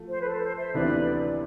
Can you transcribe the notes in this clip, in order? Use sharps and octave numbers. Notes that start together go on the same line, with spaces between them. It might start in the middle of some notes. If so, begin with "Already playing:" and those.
Already playing: F3 A3
C5
B4
A4
C5
C5 E5
D2 C3 E3 B3 D4 B4 D5